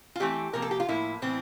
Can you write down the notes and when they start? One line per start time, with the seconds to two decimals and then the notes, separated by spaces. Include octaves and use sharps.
0.16 F4
0.20 E3 A3 C4 G4
0.53 C3 F3 A#3 A#4
0.62 A4
0.71 G4
0.80 F4
0.88 A2 F3 A#3 E4
1.22 A2 E3 C4